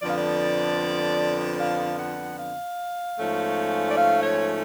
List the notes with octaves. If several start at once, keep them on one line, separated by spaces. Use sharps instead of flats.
F2 D3 F3 B3 D5
F5
D5
F5
F#5
F5
G#2 F3 A3 C#4
D5
F5
C#5